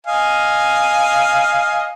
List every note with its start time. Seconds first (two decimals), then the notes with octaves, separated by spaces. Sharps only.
0.07 D#5 F5 G#5